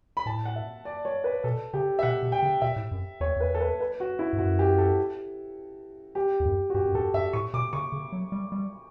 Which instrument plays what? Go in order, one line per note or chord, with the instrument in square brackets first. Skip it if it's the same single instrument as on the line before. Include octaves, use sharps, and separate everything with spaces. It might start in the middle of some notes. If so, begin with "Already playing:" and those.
[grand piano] B5
[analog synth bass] A2 [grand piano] A5
[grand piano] F#5
E5
D5
C#5
B4
[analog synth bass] B2 [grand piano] A4
[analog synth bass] C#3 [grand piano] G4
[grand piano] E5
[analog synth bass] B2 [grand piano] F#5
[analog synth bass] B2
[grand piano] G5
[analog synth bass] C#3
[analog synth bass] B2 [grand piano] E5
[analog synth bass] A2
F#2
[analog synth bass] E2 [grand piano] C#5
[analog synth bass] E2 [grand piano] B4
[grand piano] A4
B4
B4
F#4
E4
[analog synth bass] G2
[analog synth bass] F#2 [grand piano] F#4
[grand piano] G4
A4
G4
[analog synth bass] E2
F#2
[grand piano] F#4
[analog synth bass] G2 [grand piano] G4
[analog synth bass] F#2
[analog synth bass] G2 [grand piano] A4
[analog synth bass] G2 [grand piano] E5
[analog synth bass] A2 [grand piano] C#6
[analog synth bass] B2 [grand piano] D6
[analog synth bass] C#3 [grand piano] C#6
[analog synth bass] C#3
F#3
G3
G3